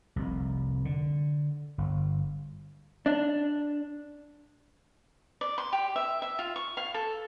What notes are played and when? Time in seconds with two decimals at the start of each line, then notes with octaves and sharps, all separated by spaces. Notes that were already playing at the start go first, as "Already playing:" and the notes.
0.16 F1 C2
0.85 D3
1.78 G1
3.06 D4
5.41 D5
5.58 C6
5.73 G4
5.96 E5
6.22 E5
6.39 F4
6.56 C#6
6.77 F5
6.94 A4